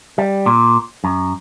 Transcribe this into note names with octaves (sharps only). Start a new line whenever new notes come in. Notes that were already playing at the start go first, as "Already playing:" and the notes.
G3
A#2
F#2